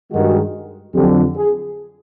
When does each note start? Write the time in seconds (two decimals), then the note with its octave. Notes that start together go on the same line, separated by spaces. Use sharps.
0.12 G2 D#3 G#3 F#4
0.95 F2 D3 F#3 G4
1.37 G#4